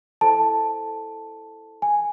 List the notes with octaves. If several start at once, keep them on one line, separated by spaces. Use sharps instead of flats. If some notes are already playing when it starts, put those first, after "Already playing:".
E4 A4 C5 A5
G#5